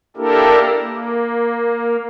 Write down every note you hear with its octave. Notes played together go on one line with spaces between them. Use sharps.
A#3 D4 E4 G4 A4 A#4
A#3